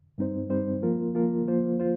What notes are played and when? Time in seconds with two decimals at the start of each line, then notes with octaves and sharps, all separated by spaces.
0.18 G2 G3 C4 D#4 C5
0.49 G2 G3 C4 D#4 C5
0.82 F3 A#3 F4 A#4
1.15 F3 A#3 F4 A#4
1.47 F3 A#3 F4 C5
1.79 F4 C5